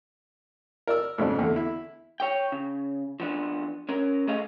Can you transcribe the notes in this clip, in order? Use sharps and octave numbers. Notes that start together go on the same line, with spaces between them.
A#4 D5 E6
F2 G#2 C#3 D4
E2 D3
E4
C#5 G5
C#3
F3 B3 D4
C#4 A#4
A3 G#4 D#5 F5